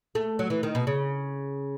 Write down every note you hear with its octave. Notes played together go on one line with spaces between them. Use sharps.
A3
F#3
E3
D#3
B2
C#3